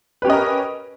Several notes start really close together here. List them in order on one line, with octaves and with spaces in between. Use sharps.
B4 G4 C#4 D#5 A#4